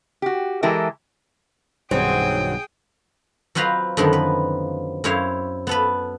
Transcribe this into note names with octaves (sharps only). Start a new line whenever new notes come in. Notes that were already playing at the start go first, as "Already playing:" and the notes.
F#4 G4
E3 G#3 E4 G4 A4 A#4
B1 G2 D#3 F#3 C4 G#4 G5
F#3 C4 F4 B4 D#5 F5
F#2 D3 D#3 F3 B3
B4
F#2 C4 E4 C#5 F5
B3 A4 B4